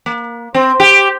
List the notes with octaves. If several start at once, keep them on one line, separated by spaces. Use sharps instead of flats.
A#3
C4
G4